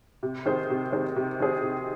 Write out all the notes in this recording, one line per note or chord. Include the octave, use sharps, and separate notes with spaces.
C3
D#3 C4 G#4 C5
C3
D#3 C4 G#4 C5
C3
D#3 C4 G#4 C5
C3